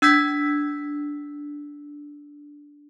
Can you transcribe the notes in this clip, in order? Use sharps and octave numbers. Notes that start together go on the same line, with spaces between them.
D4 E6 G6 G#6 B6